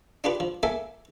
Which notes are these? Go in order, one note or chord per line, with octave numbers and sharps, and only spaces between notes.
D4 F4 G4 B4
F3
A#3 A4 E5 G#5